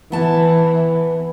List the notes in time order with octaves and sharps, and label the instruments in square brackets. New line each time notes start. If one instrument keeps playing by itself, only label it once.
[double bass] E3 [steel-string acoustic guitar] B3 A5